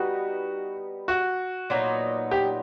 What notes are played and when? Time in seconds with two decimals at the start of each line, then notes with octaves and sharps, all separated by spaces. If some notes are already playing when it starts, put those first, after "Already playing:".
Already playing: G3 B3 D#4 F#4
1.08 F#4
1.70 A#2 F#3 B3 D#4
2.31 G4